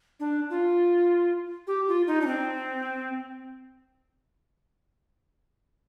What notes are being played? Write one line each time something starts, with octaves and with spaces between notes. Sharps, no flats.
D4
F4
G4
F4
D#4
D4
C4